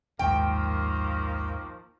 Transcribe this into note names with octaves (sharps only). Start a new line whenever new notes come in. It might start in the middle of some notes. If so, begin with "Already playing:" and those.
A#1 D#2 G#2 D#3 F3 A#3 G5